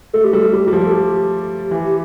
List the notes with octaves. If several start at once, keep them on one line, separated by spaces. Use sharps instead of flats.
A3 A4
G4
G3 A4
G3 G4
G3
F3
A4
G4
E3